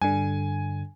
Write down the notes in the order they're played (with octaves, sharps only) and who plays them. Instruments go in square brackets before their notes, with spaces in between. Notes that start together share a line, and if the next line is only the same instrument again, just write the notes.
[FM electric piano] G2 D3 [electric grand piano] G#5